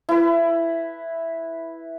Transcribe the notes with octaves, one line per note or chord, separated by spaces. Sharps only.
E4 B4